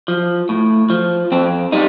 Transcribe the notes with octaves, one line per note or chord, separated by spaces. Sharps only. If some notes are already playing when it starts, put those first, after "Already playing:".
F3
A2
F3
F2 C4
G3 D#4